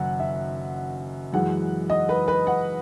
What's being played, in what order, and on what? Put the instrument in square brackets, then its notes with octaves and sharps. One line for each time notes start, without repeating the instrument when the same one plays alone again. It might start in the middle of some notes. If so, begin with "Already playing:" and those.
Already playing: [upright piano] F#1 F#2 D#3 F#5
E5
F#2 E3 G#3 F#5
D#5
B4
B4
F#5